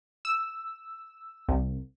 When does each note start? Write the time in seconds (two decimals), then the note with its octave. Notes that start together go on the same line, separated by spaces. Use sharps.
0.25 E6
1.49 C2